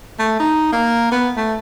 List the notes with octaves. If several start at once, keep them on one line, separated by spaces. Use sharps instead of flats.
A3
D#4
A#3
B3
A3